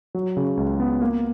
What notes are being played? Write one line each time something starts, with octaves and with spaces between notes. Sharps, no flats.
F#3
C#3
C#2
B3
A#3